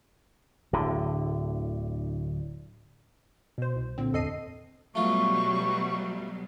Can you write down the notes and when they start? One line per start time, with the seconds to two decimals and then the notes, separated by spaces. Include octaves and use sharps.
0.73 D1 A2 D3
3.58 B2 C5
3.76 C2
3.98 A#2 D3 C4
4.13 G#1 E2 A4 D#5 C7 D#7
4.95 B2 F#3 G3 A3 F4 C#6